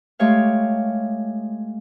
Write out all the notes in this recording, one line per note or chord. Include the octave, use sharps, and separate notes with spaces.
G#3 A3 G4 C#5 F5